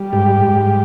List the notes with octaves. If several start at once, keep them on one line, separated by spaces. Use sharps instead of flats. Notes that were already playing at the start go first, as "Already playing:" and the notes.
Already playing: G3
G#2 G4
G#2